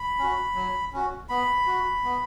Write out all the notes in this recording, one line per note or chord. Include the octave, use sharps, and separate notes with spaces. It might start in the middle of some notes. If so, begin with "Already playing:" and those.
Already playing: B5
C#4 F#4
F#3
C#4 F#4
B3 B5
F#4
B3